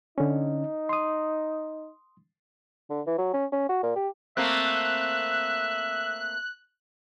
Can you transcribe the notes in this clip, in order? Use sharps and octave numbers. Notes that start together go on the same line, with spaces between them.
D3 C#4 D#4
C6 D#6
D3
E3
F#3
C#4
C#4
F#4
A#2
G4
A3 A#3 C4 E5 F#6